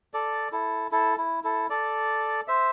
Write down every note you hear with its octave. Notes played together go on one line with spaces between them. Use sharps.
A4 D5
E4 A4
E4 A4
E4
E4 A4
A4 D5
C5 E5